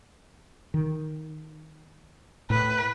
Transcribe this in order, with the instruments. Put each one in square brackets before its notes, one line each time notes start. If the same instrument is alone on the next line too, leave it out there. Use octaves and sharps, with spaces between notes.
[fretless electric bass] D#3
[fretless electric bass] A2 [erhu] B4